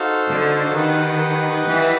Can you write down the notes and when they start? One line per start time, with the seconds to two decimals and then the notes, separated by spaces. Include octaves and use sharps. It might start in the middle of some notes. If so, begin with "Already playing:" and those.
Already playing: D#4 F#4 A4 C5 F5
0.27 D3
0.73 D#3 G4 B4 D#5 F#5
1.66 E3